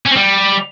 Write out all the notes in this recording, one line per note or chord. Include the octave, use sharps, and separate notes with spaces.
C#4
C4
G3